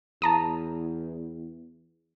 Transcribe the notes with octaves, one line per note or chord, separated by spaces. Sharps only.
E2 A5 A#5 D#6